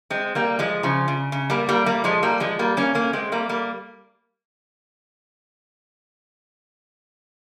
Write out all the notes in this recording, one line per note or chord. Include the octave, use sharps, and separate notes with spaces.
G#3 C4
G3 A#3
F3 G#3
C#3 F3
C#3
C#3
G3 A#3
G3 A#3
G3 A#3
F3 G#3
G3 A#3
F3 G#3
G3 A#3
A#3 C#4
A#3 C#4
G#3 C4
G3 A#3
G3 A#3